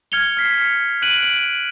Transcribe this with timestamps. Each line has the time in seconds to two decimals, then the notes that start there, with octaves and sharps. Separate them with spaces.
0.12 F6 G#6 C#7 F7 G7
0.37 F6 B6 C7
0.62 C#7
1.02 F#6 B6 D7 D#7 F#7
1.23 D7 F#7